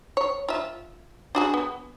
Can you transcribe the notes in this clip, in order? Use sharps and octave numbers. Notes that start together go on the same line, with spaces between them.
C#5
F4 E5
D4 F#4 G#4
B3